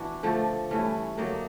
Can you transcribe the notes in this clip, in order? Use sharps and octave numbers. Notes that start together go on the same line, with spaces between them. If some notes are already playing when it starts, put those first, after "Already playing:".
Already playing: E3 B3 D4 F#4
D3 F3 A3
G2 E3 A3 C#4
D3 F#3 A#3 D#4